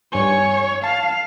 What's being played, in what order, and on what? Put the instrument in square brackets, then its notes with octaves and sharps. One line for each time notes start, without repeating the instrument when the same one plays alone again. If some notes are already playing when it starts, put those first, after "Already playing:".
[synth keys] G2 G#5 [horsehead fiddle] C#5
[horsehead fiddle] F5 [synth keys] A5